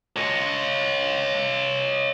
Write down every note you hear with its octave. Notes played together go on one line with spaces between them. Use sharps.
C#5 D#5